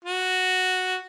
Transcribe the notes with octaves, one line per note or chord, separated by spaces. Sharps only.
F#4